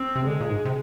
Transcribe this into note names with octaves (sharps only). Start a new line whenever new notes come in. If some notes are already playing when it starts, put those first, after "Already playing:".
Already playing: C4
C3
D3 G#3
A#2
G#2
C3